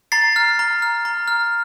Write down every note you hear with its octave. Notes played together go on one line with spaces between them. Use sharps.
A#5 A6 C7
F6
A#5
F6
A#5
F6